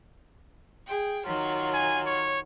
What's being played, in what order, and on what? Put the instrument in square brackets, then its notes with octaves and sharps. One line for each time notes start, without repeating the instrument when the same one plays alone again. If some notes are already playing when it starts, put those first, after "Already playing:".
[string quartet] G#4 G5
D#3 F#3 F4
[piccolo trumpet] G#5
C#5